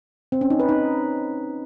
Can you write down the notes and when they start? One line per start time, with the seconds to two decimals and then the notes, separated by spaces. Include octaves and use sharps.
0.32 C4
0.41 C#4
0.50 D#4
0.60 B4
0.69 D#4